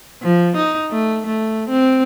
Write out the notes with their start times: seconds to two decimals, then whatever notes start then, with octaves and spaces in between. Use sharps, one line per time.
0.23 F3
0.57 D#4
0.91 A3
1.26 A3
1.69 C4